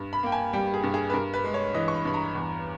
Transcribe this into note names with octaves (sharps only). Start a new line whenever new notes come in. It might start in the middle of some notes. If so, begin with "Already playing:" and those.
Already playing: G2
B5
A#3 G5
G#5
G3 G5
G#4
G2
G#4
B4
G2 A#4
B4
G#3
C#5
E3 D#5
C#6
B5
G2 B5
A#5
E2